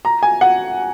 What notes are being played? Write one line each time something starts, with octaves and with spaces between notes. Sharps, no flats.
A#5
G#5
F#5